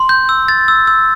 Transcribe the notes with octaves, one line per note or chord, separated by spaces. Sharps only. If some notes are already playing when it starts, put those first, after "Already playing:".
Already playing: C6
G6
E6
A6
E6
E6